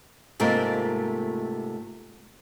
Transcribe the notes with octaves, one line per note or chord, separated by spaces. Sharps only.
G#2 C3 A3 A#3 F4 A#4